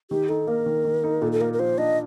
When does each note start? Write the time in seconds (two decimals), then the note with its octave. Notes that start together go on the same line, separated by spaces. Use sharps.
0.11 D#3 G4
0.29 D#4 A4
0.47 A#3 A#4
0.66 D#3
0.85 D#3
1.04 D#4
1.22 A#2 A4
1.32 A4
1.41 A#3 A#4
1.53 A#4
1.59 F3 C5
1.78 D4 D#5